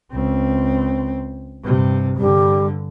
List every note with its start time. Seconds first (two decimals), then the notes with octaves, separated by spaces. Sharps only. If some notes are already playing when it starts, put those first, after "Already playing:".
0.12 C#2 C4
1.64 G2 C3
2.16 G2 D3 G3